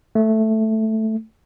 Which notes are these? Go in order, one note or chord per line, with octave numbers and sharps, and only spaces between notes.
A3